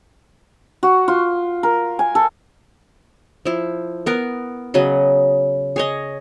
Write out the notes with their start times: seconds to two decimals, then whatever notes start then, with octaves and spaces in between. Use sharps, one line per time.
0.83 F#4
1.08 F4
1.63 A#4
1.99 G#5
2.15 A4
3.45 F3 E4
4.06 B3 A#4
4.74 C#3 F#3 D#5 B5
5.76 G#4 C#5 D#5